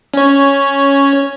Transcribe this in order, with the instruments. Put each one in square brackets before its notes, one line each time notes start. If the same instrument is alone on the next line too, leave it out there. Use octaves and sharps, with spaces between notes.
[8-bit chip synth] C#4 C#5